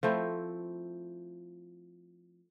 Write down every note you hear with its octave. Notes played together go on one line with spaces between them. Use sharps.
F3 A3 C4 E4